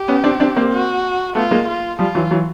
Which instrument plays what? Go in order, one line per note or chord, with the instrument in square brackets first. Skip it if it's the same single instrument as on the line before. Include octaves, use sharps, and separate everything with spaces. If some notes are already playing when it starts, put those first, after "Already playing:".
Already playing: [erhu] G4
[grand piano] B3 C#4
C4 D4
C4 D4
A#3 C4
[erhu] F#4
[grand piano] A3 B3 [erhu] F4
[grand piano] G#3 A#3
[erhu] F4
[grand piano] F3 G3 [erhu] F4
[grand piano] E3 F#3
E3 F#3